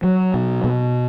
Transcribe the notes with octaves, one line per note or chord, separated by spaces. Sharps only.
F#3
B2
B2